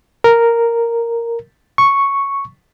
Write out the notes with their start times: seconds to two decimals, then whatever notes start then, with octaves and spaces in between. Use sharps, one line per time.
0.24 A#4
1.78 C#6